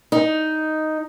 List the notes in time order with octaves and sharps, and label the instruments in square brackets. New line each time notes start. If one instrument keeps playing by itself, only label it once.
[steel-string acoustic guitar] D#4